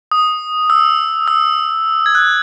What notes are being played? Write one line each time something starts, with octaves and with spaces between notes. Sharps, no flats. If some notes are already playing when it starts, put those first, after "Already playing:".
D#6
E6
E6
G#6
F#6